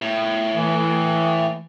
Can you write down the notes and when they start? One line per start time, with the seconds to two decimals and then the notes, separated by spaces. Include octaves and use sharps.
0.02 A2
0.55 E3